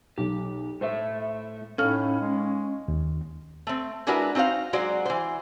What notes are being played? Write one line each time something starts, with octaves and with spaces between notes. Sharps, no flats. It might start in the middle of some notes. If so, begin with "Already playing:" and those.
B1 G4
A2 A3 C5 E5
A2 C#4 D#4 A4 F5 F6
G#3
D#2
A3 C4
G#3 D4 E4 F#4 A#4 B4
C4 D#4 F#4 C5 F5
F#3 G#3 F#4 C5 D5
E3 C5